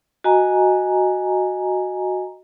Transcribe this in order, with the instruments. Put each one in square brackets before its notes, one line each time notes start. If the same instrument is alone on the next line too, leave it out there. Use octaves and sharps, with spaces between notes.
[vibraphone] F#4 D#5 G#5 A#5